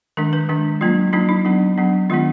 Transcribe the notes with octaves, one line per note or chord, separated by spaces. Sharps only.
D#3 G#3 D4 A#4
B4
D#3 G#3 D4
F#3 A#3 D4 F4
F#3 A#3 D4 D#4
D#4
F#3 B3 D4
F#3 B3 D4
D#3 G#3 B3 D4 F4